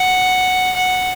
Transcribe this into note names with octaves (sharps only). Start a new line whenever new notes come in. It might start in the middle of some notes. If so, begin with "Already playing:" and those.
Already playing: F#5
F#5